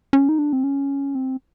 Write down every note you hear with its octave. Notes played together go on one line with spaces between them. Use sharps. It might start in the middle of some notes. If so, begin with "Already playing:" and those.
C#4
D#4
D4
C4
C#4
C4